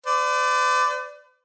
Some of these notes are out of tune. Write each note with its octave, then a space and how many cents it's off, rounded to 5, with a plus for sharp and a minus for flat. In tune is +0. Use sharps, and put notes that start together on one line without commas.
B4 +45 D5 +0